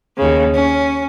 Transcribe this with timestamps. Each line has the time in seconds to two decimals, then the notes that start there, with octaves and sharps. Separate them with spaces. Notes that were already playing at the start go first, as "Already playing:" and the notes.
0.17 D#2 C#3
0.55 C#4